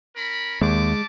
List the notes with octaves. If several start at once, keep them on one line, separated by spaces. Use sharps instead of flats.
C#4 A#4 B5
D#2 G3 G#3 A5 D6